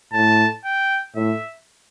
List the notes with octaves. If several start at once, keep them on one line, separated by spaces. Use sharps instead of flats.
A2 A5
G5
A2 E5